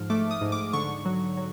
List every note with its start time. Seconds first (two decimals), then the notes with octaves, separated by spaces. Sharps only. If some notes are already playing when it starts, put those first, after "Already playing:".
Already playing: G#2 F3 F6
0.10 A3 D6
0.31 D#6
0.41 G#2
0.52 D6
0.73 D3 C#6
1.05 F#3
1.37 F#3